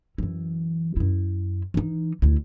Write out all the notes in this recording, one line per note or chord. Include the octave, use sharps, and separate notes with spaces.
F#2 E3
F#2 E4
E3 D#4
D2 E4